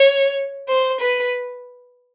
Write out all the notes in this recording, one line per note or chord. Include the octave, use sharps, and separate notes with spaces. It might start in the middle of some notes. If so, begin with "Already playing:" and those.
Already playing: C#5
C5
B4